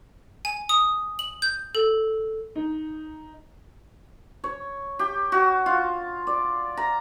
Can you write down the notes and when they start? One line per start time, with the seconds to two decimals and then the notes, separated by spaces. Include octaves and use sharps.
0.45 G#5
0.69 D#6
1.19 F#7
1.42 G6
1.75 A4
2.56 D#4
4.44 C#5
4.99 G4
5.32 F#4
5.66 F4
6.27 D5
6.77 A#5